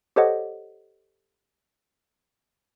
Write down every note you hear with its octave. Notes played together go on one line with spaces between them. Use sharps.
G4 A4 C5 C#5 D#5 F#5